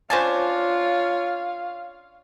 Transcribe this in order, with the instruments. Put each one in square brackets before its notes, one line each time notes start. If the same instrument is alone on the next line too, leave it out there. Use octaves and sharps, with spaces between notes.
[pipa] C#4 D4 G#5 [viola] F4 C#5 [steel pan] C5 A5 [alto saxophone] F5